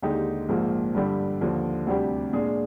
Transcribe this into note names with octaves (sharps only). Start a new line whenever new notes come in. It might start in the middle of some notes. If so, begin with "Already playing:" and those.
D#2 D3 G#3 D#4 G4
A#1 G#2 F3 A#3
G2 D3 G3 D4 G4
D#2 D3 F3
D2 C3 G3 D4 G4
A#2 G#3 D4 G#4